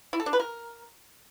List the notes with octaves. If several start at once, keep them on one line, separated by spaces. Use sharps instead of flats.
E4
A4
D4
B4
A#4